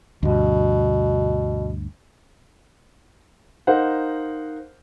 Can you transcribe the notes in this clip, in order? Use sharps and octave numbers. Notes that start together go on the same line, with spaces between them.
D2 G2 B2
D#4 A#4 C5 F5 F#5